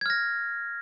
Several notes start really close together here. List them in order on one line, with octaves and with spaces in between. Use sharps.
G#6 F6 A#6